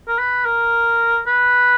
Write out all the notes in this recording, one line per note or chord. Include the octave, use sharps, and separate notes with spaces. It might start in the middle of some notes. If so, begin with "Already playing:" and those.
A#4
B4
A#4
B4